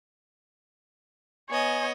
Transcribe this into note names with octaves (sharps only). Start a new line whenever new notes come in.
B3 C#5 D#5 G#5